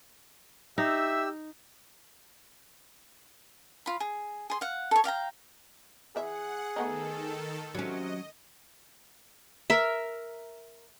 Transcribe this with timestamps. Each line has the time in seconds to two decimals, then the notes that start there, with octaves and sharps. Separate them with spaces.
0.78 D#4 G4 E5 E6
3.86 F4 B5
4.00 G#4
4.50 G#4 C6
4.61 F5 F#5
4.91 A4 C#5
5.04 D5 F5 G5 A#5
6.16 E3 G#4 E5 F#5
6.76 D#3 A3 B3 D#4 A4
7.75 C3 F#3 C#4 D#5
9.70 A#4 E5